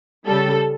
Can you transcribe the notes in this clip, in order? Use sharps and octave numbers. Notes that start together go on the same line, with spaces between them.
C#3 G3 A4